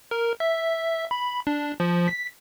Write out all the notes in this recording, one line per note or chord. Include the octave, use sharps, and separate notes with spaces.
A#4
E5
B5
D4
F3
B6